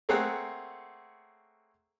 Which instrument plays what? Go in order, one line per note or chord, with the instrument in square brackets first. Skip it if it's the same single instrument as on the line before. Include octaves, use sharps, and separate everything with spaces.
[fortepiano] A3 A#3 C4 G#4 C#5 F#5